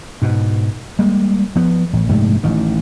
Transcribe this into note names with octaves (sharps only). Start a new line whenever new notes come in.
G#2 B2
G3 G#3 A#3
F3 B3
A1
A#1 G#2 C3 A3
A1 D#3